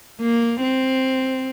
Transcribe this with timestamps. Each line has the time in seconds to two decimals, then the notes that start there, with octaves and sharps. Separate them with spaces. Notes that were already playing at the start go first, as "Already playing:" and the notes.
0.21 A#3
0.62 C4